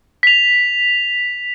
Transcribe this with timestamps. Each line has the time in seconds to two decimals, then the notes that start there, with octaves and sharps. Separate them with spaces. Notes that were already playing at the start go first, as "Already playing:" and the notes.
0.23 B6 F7